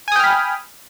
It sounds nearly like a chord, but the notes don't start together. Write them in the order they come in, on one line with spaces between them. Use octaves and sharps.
G#5 D#6 G5 F6 B5